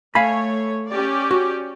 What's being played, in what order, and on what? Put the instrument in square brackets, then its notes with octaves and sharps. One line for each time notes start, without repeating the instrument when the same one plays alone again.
[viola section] A3 C#5 [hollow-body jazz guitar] F5 G#5 B5
[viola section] C#4 G4 D5
[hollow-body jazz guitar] F#4